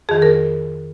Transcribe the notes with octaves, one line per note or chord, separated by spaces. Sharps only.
F2 D#3 G#4
A#4